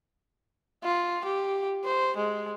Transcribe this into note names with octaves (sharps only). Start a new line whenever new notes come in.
F4
G4
C5
G#3